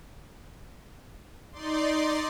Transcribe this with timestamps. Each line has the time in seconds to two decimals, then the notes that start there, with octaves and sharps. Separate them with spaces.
1.52 D#4 D5 C6